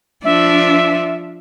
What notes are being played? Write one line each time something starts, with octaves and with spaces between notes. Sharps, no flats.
F3 D4 E5